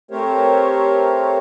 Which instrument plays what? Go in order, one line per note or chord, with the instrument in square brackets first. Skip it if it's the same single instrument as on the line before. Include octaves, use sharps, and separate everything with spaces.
[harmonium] A3 C4 G4 A#4 C5 C#5